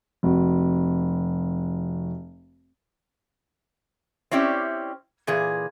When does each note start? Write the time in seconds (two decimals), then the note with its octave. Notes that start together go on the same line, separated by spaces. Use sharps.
0.23 F1 F#4
4.31 C4 C#4 E4 G4 D5
5.27 A#2 E3 G#4